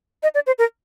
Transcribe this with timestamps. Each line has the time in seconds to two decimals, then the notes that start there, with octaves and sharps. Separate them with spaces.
0.23 D#5
0.35 D5
0.47 C5
0.58 A#4